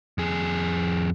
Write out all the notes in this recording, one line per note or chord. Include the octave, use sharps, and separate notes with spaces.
F2 G#4